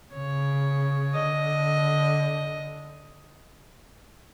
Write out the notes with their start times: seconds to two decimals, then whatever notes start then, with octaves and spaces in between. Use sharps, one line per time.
0.13 C#3 C#5
1.14 D3 D#5